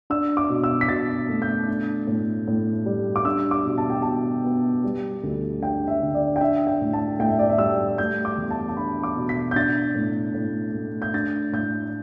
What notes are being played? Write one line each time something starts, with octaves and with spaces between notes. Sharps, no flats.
D4 E6
D6
B2
E6
B6
B2 A6
A3
G6
D4
A2
A2
G3
D6
D4 E6
D6
B2
A5
G5
B2 A5
B3
G3
D2
D4 G5
E5
D3
D5
G5
D4 E5
G5
A2
A5
A2 G5
E5
D5
E5
G3 E6
A3 G6
D6
E2
A5
A5
D4 B5
D6
B2
B6
G6
D4 A6
A2
A2
A3
G6
D4 A6
A2 G6